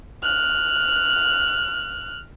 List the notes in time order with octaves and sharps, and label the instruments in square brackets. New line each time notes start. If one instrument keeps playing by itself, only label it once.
[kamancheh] F6 F#6